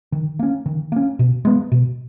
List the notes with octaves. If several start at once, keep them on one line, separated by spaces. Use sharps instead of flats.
D#3
A#3 C#4
D#3
A#3 C#4
B2
G#3 B3
B2